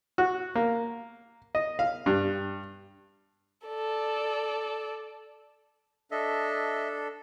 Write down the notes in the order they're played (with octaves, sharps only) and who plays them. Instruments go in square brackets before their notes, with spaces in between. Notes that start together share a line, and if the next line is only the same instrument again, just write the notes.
[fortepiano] F#4
A#3
D#5
F5
G2
[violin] A4 D5
[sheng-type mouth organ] D4 A4 [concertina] D#5 E5